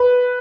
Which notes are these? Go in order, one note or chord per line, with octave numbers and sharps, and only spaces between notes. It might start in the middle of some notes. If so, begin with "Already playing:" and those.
Already playing: B4